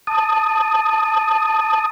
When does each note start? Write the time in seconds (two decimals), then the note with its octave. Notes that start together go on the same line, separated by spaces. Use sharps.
0.07 A5 D#6